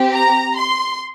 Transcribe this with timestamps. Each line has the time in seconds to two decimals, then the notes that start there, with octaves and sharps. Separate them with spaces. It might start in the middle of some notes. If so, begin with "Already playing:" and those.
Already playing: C4 G4
0.14 A#5
0.57 C6